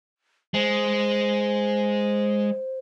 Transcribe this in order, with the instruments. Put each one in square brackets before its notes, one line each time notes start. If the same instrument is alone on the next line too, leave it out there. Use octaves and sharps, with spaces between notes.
[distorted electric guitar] G#3 [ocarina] C5